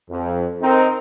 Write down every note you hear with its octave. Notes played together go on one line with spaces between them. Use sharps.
F2
C4 D#4 A#4